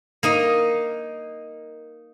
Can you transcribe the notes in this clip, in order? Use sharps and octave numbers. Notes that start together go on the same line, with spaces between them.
A#3 D#4 D#5